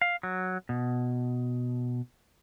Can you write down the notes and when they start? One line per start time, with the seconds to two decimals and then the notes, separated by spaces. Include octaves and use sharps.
0.02 F5
0.23 F#3
0.69 B2